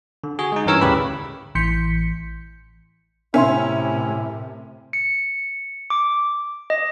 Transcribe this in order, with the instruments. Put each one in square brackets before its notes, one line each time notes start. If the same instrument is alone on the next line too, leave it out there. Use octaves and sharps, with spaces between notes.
[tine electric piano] D3
F#4 G#4
G#3 D#4
G2 E3 C#4 A#4 C#5 E6
D2 A2 C#3 G4 B4 B5
[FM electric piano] A1 E3 C6 G6 B6 C#7
[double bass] A2 C3 [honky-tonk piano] C#4 [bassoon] E4 [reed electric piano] A#4 E5 C6
[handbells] C#7
D6
D#5